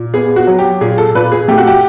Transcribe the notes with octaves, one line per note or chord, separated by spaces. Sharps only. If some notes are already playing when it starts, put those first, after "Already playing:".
Already playing: A#2
B3 G#4
F#4
F#3
G4
A#2 G#4
A4
A#2 B4
G#4
A3 G4
F#4
G4